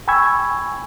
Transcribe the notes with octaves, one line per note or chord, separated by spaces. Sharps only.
G5 G#5 B5 C#6 E6 G#6